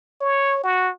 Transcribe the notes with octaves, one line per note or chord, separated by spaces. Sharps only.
C#5
F#4